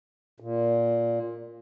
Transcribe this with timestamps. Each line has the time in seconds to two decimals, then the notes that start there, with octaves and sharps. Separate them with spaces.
0.40 A#2